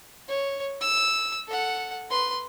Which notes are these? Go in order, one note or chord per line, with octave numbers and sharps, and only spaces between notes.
C#5
E6
A4 F#5
B4 C6